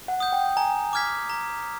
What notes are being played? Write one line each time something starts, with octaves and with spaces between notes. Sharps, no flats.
F#5
D#6 G6
G5
G#5 A#5
D6 F6 G#6 B6
A#5